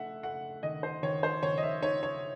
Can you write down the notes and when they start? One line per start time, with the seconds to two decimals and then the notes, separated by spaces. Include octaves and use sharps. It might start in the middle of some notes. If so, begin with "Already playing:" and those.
Already playing: A3 E5 F#5
0.23 A3 F#5
0.63 D#3 D#5
0.83 C5
1.03 D#3 C#5
1.23 C5
1.43 D#3 C#5
1.57 D#5
1.63 E5
1.83 D#4 C#5
2.03 C#5